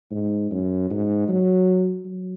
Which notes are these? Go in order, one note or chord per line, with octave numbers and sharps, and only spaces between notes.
G#2
F#2
G#2
F#3
F#3